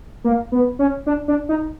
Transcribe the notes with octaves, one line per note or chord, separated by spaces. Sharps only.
A#3
B3
C#4
D4
D4
D#4